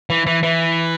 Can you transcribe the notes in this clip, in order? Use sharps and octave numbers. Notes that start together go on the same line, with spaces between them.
E3
E3
E3